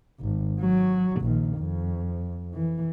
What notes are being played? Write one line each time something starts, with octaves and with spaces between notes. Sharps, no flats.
G#1
F#3
A#1 D#3
F2
E3